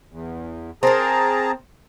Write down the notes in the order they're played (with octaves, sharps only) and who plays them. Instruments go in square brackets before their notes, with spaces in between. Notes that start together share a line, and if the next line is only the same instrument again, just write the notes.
[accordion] E2
[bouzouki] C4 A#4 [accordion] G#4 A5 A#5